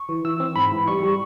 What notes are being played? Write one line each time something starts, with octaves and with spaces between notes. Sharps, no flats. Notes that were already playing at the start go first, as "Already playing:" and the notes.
Already playing: C#6
E3
E3 E6
C4
G#2 B5
E3
G3 C#6
G3